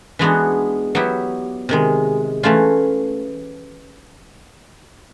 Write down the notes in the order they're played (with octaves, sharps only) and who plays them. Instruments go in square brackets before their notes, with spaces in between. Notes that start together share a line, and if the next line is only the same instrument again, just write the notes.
[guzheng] E3 G#3 B3 D4 F#4
F#3 B3 E4 G4
C3 D#3 G#3
E3 A3 C#4 F4